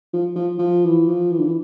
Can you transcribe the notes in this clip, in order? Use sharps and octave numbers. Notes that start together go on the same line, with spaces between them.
F3
F3
F3
E3
F3
E3
D3
E3